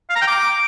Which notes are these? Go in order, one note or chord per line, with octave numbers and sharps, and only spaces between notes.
F5
A#5
G5
D6